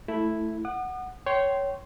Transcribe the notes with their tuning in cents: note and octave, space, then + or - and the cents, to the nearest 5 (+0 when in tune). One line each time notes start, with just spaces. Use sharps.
A3 +0 E4 +0
F#5 +0 D#6 -45
C#5 +5 G5 -25 C6 +0